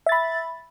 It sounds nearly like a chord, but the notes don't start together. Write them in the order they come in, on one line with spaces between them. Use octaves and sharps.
E5 A6 B5